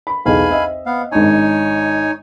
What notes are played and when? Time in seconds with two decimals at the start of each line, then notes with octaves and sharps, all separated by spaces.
0.07 B5
0.26 B1 E2 F5 G#5 B5
0.49 C4 D#5 E5
0.86 B3 F5
1.12 G#1 D4 D#4 C#5 G#5